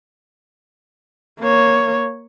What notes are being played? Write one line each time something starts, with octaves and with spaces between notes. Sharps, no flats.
A#3 C#5